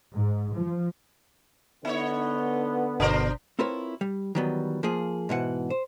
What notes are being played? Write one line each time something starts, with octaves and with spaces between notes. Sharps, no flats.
G#2
F3
D3 B3 D#4 C#5
G1 B2 D4 A#4 C5
C4 E4 F4 A#4 B4 C#5
G3
D#3 E3 F#3 G3 B3
F3 A#3 F4 G#4
G#2 B2 E3 F#5
C5